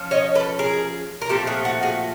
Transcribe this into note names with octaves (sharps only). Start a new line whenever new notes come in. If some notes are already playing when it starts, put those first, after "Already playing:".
Already playing: F3 C#4
C#5 D#5
A4 B4
G#4 A#4
A#4
A#2 F3 A3 C4 G4 A4
F#4 G#4
F#4
F#4 G#4